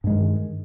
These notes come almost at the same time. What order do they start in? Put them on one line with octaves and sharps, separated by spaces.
G2 G#3 D#3